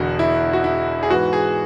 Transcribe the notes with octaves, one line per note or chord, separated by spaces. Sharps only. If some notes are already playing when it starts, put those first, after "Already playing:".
Already playing: E1 E2 D3 F#4
E4
F#4
E4
G#4
G#2 E3 B3 F#4
G#4